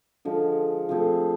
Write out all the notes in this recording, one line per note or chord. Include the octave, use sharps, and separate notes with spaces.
D3 F3 G#3
F3 A3 C4 G#4